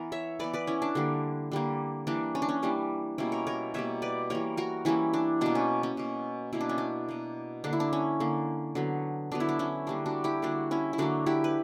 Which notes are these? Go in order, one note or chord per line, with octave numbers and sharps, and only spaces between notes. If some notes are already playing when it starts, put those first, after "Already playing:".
Already playing: E3 B3 A#4
C#5 E5
E3 B3 B4 D5
B4 D5
C#4 E4
D4
D3 G3 A#3
D3 G3 A#3
E3 G3 A#3 D4
C#4
D4
C#4
E3 G3 A#3 D4
B2 G3 A#3 C#4 E4
A#4 C#5
A#4 C#5
B2 G3 A#3 C#5 E5
B4 D5
E3 G3 A#3 A#4 C#5
F#4 A#4
E3 G3 A#3 C#4 E4
D4
B2 A#3 D4
C#4
C#4
B2 A#3
B2 A#3 E4
D4
C#4
D4
B2 A#3
D3 A#3 D4
E4
D4
C#4
D3 A#3
D3 F#3 B3
D3 F#3 B3 D4
E4
D4
C#4 E4
D3 G3 A#3 D4
D4 F#4
E4 G4
D3 G3 A#3 D4 F#4
C#4 E4
E4
D3 F#3 A#3 D4 F#4
E4 G4
B4